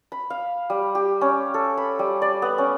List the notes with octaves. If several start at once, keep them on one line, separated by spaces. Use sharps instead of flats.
B5
F5
G3
G4
C#4
A4
B5
G3
D5
B3
C#4